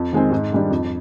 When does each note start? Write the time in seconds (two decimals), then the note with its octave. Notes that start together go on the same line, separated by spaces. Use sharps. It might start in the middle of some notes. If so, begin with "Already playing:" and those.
Already playing: F2
0.13 D#3 G#3 C4
0.32 G#2
0.52 D#3 G3 D4
0.71 F2